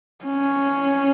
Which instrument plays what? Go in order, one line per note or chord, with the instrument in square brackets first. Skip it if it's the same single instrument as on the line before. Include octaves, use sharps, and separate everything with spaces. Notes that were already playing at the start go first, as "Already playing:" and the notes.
[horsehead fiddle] C#4